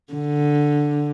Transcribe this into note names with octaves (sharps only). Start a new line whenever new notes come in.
D3